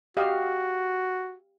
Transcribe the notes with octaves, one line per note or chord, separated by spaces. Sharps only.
F#4 G4 D#5 F5